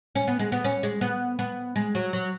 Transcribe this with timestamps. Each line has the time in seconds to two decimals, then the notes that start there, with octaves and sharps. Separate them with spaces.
0.15 C#4
0.28 B3
0.39 G#3
0.52 B3
0.64 C#4
0.83 G#3
1.01 B3
1.39 B3
1.76 G#3
1.95 F#3
2.13 F#3